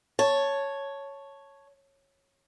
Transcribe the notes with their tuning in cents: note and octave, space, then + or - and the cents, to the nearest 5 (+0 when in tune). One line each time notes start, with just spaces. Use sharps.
C#5 +0 A5 +0